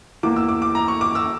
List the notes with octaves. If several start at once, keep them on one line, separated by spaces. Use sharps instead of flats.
E2 E3 A#3 D6
E6
D6
D6
A#5
C#6
D6
E6